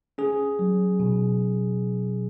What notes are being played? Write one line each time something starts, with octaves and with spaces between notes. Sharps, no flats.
C#4 G#4
F#3
B2